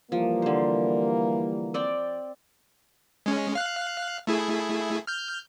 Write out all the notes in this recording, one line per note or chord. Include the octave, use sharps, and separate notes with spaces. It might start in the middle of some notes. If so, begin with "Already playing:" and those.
E3 F3 G3 A#3
D3 C5
C4 D5 G5
G#3 C#4
F5 F#6
A3 E4 G#4
F6 G6